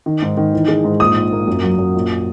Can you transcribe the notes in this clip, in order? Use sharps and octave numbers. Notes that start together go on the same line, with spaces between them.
D#3
G#2
D#3
E3
G#3
G#2
A#1 D#6
A#1
A#3
F#2
F#3
F#2
A#1